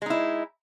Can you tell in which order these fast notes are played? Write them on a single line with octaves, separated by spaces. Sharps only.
G#3 D#4 E4